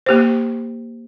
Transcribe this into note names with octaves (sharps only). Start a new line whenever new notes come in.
A#3 G4 C5